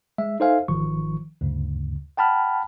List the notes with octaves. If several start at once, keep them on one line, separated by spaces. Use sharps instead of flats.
G#3 E5
D#4 A4 C5 E5 F5 G#5
G#1 D#3 F3 C#6
D2 G2 C#3
F#5 G5 A5 B5 F6